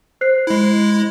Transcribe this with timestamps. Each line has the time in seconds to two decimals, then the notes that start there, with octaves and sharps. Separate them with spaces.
0.21 C5 F#6 C7
0.47 G#3 E4